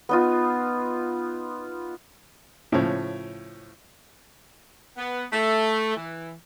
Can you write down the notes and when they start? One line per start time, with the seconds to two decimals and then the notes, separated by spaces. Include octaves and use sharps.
0.09 B3 D#4 F4
2.72 A2 C#3 F3 C#4
4.97 B3
5.32 A3
5.96 E3